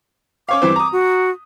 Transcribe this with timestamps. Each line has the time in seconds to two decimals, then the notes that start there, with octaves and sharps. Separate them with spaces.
0.49 C#4 C#5 F5 D6
0.62 G2 E3 C4
0.76 A#5 D#6
0.92 F#4